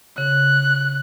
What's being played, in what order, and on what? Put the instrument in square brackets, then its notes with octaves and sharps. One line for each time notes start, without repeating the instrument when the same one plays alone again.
[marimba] C#3 [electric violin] F#6